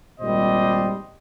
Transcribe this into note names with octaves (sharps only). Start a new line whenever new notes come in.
G#1 A#2 G3 C5 D#5